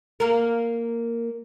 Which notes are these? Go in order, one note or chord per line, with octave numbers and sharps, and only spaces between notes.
A#3 A#4